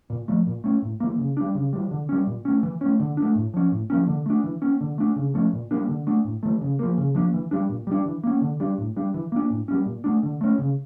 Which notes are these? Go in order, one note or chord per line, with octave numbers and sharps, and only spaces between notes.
A#2
F3 A3
A#2
A3 C#4
A2
E3 A#3
C#3
G3 D4
C#3
E3 G3
D3
G3 C#4
A#2
A3 C#4
E3
A3 C#4
D3
D4
A3
A2
F3 C#4
A2
F3 A#3 C#4
D3
A3 D4
E3
A#3 C#4
D3
A3 D4
C#3
F3 A3 C#4
A#2
G3 A#3 D4
D3
A3 D4
A2
E3 A3
C#3
F3 A#3
C#3
F3 A#3 D4
E3
G3 D4
A#2
G3 D4
E3
A#3 C#4
D3
G3 D4
A2
G3 D4
E3
A#3 D4
A2
G3 A#3 C#4
A#2
A3 D4
D3
A3 C#4
C#3